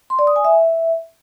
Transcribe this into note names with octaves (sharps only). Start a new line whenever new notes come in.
C6
D5
D#6
G#5
E5